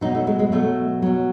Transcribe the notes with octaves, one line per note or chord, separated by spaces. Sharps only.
B2 F#3 D#4
A3
G#3
G#3
B2 F#3 A3
B2 F#3